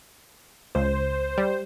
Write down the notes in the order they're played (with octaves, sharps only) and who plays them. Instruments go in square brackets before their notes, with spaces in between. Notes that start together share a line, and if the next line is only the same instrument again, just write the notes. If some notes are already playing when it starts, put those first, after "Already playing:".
[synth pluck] C#2 [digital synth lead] C5
[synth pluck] G3